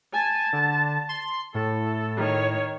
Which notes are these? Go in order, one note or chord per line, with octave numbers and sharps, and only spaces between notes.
G#5 A5
D3
C6
A2 A4
D#3 C#5